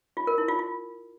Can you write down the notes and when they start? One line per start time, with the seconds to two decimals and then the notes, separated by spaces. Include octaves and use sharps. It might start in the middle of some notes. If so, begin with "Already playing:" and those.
0.17 F4
0.27 A#4
0.38 E4
0.48 F4
0.59 F4